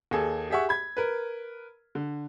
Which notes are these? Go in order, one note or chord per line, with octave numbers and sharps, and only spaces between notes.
D#2 G#4 A4
G4 G#4 E5 F#5 C#6
B5 G#6
A#4 B4
D3